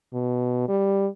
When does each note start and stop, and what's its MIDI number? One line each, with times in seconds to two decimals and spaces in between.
0.13 0.65 47
0.68 1.07 55